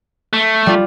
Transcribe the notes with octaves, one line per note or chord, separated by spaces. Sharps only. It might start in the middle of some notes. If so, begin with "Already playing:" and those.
A3
G3 F4